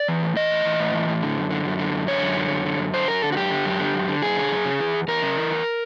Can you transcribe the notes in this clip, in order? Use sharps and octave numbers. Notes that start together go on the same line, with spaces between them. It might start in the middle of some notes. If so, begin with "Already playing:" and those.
Already playing: D5
E3
A2
E3 D#5
A2
E3
A2
E3
A2
D3
F#2
D3
F#2
D3
F#2
D3 C#5
F#2
D3
F#2
D3
F#2
D3 C5
F#2 A#4
D3 A4
F#4
F#2 G4
D3
F#2
D3
F#2
D3
F#2 G#4
D3
F#2
C#3
E3
E2
E2 A#4
C#3
E3
E2